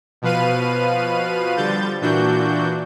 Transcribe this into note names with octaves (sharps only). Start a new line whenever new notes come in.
B2 F3 B4 F5 D#7
D3 F3 G3 G6 A6
A#2 E3 D4 F#4 G6